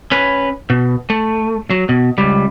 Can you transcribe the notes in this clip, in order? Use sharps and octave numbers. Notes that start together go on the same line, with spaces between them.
C#4 B4
B2
A3
F#3
B2
C#2 G3